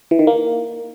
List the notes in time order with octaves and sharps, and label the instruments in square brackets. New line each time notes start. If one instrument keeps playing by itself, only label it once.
[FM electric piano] E3
D#3
A#3